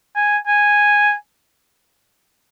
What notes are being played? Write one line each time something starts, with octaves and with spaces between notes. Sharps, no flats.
G#5
G#5